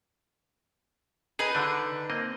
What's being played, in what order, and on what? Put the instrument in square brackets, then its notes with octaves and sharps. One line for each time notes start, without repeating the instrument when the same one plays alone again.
[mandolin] D#4 B4 [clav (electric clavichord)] G#4
[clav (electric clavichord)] D3 D4
A#3 C4 D#5